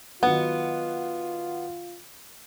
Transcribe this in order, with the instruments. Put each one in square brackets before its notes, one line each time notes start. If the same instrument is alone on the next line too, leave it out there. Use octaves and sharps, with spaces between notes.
[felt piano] D#3 F#3 F#5 [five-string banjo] B3 [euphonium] F4